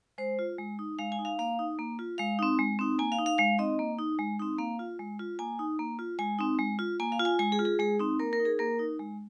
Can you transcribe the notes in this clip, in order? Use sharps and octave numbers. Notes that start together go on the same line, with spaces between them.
G#3 C5
F4
G#3
D#4
G#3 F5
G#5
D#4
F5
A#3 F5
D#4
A#3
F4
G#3 F5
C4 D#4
G#3
C4 D#4
A#3 G#5
F5
D#4
F5
G#3 F5
C4 D#4 D#5
A#3
D#4
G#3
C4 D#4
A#3 F5
F4
G#3
F4
A#3 G#5
D#4
A#3
F4
G#3 G#5
C4 D#4
G#3
F4
A#3 G#5
F5
F4
G#5
G#3 G#5
G#4
F4
G#4
G#3 G#4
C4 D#4
A#3 A#4
A#4
D#4
G#4
A#3 A#4
D#4
G#3